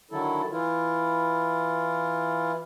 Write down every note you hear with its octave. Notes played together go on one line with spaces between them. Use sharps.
D3 D#3 F#3 E4 A4
E3 E4 F4